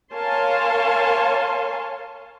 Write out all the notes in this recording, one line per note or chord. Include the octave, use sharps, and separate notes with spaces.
A#4 C#5 F5 G#5 A5 C6